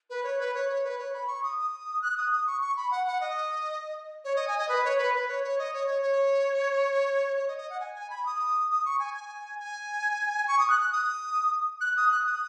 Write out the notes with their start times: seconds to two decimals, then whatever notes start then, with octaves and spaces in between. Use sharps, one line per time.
0.10 B4
0.24 C#5
0.39 B4
0.54 C#5
0.69 C#5
0.84 B4
0.98 C#5
1.13 B5
1.27 C#6
1.43 D#6
1.58 D#6
2.02 F#6
2.17 D#6
2.32 D#6
2.47 C#6
2.61 C#6
2.76 B5
2.91 F#5
3.07 F#5
3.21 D#5
4.25 C#5
4.36 D#5
4.48 G#5
4.58 D#5
4.69 B4
4.85 C#5
4.98 B4
5.14 B4
5.28 C#5
5.44 C#5
5.59 D#5
5.73 C#5
5.88 C#5
6.02 C#5
7.36 C#5
7.48 D#5
7.58 D#5
7.70 F#5
7.80 G#5
7.95 G#5
8.10 B5
8.26 D#6
8.70 D#6
8.85 C#6
8.99 G#5
9.14 G#5
9.59 G#5
10.48 C#6
10.59 D#6
10.70 F#6
10.81 F#6
10.92 D#6
11.81 F#6
11.97 D#6
12.11 F#6
12.26 D#6